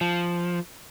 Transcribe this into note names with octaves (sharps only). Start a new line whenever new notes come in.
F3